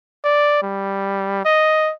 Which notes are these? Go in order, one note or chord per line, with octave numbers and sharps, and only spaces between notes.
D5
G3
D#5